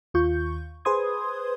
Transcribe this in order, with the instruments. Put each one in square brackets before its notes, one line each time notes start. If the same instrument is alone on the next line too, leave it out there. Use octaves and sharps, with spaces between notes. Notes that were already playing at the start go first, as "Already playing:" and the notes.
[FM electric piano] D#2 F4 C#6 G6
G#4 B4 C5 C6 D#6 G#6